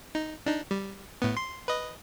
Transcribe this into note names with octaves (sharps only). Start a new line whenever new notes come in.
D#4
D4 D#4
G3
A2 B3
C6
B4 D#5